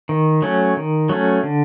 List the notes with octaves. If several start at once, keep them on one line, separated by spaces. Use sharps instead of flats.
D#3
F#3 A3 C#4
D#3
F#3 A3 C#4
D3